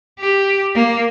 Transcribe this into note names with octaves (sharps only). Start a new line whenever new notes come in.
G4
A#3